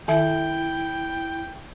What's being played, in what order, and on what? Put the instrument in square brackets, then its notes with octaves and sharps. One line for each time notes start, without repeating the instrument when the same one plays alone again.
[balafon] D#3 E5 [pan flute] E4 [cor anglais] G5